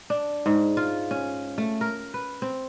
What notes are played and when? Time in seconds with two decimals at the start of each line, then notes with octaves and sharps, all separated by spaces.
0.10 D4
0.46 G#2
0.77 F4
1.11 C#4
1.58 A3
1.81 A#4
2.14 B4
2.42 C4